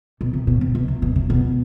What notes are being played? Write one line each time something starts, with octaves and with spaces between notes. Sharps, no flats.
B2
C3
B2
C3
B2
C3
B2
C3
B2